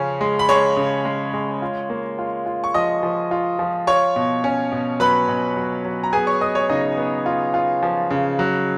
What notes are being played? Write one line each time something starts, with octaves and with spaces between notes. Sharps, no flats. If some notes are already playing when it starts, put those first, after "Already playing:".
Already playing: C#3 F3 C#4
G#3
B5
G#3 C#5 C#6
C#3
G#3
G#3
F4
A#3
F4
F4
C#6
F3 D#5 D#6
F3
F4
F3
F4 C#5 C#6
B2
C#4
B2
F#3 B4 B5
B2
F#3
F#3
A#5
B3 G#4 G#5
C#5 C#6
B3 D#5 D#6
C#5 C#6
C#3 D#4 D#5
B3
F4
F4
F3
C#3
F#3